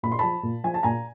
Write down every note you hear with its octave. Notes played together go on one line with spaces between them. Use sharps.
A#2 B5
C6
F3 A5 B5
A#2
F3 G#5
A5
A#2 G#5 A#5